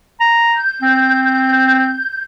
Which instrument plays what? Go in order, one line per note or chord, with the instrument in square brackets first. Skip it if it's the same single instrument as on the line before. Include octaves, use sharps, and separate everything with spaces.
[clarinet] A#5
[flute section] G6
[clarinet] C4